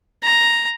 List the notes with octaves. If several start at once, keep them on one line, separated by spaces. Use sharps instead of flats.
A#5